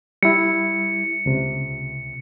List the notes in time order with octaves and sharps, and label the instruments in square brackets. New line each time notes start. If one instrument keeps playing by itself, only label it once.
[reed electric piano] G3 E4 [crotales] C#7
[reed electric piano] C#2 C3